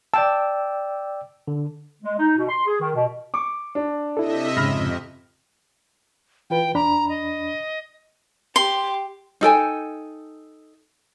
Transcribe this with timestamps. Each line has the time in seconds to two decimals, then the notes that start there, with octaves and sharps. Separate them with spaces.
0.14 D5 G5 A5 E6
1.48 D3
2.02 G#3
2.18 D#4
2.36 B2
2.48 C6
2.66 G#4
2.80 D#3
2.95 B2
3.34 C#6 D6
3.75 D4
4.17 C3 E4 A4 D#5 E5
4.57 F2 G#2 C#3 B5 F6 A#6
6.50 E3 F4 B4 G5
6.75 E2 D4 A#5 B5
7.09 D#5
8.56 G4 C6
9.41 D#4 A4 G5 G#5